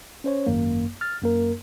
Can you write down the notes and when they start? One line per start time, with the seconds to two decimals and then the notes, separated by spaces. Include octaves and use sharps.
0.24 C#4 C5 C#5
0.47 G#1 F#2 A#3
1.01 F6 A6
1.22 F#2 A#3 A#4